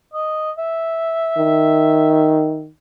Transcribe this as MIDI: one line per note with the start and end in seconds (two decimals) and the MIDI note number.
0.13 0.51 75
0.58 2.61 76
1.37 2.69 51